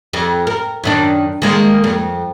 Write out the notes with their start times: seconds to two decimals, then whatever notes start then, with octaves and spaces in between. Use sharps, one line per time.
0.13 F2
0.47 A#4
0.84 F#2 D#3 D4
1.42 D#3 G#3 A#3
1.84 F2